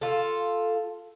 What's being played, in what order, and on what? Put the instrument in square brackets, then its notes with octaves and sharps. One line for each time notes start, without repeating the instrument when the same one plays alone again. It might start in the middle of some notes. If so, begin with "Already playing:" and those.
[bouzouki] F4 A4